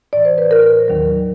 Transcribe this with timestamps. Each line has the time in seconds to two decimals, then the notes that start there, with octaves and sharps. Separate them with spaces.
0.13 A2 E3 D5
0.25 C5
0.38 B4
0.51 A#4
0.88 D#2 D#3 F#3